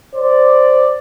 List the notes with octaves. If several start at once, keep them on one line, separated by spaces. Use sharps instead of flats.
C5 D5